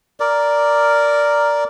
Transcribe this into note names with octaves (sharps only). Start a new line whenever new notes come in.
A#4 D5